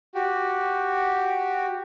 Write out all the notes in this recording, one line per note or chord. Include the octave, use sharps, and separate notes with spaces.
F#4 G4